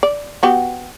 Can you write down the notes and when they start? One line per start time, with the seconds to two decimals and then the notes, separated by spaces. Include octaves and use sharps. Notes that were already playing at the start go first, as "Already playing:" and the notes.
0.03 D5
0.43 B3 F#4 G4